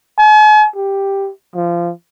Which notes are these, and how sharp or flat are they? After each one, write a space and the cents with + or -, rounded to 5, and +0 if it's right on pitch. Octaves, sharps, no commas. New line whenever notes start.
G#5 +45
G4 +5
F3 -20